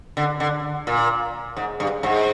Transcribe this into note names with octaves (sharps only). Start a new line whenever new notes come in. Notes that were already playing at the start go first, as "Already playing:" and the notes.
D3
D3
A#2
G#2
G2
G#2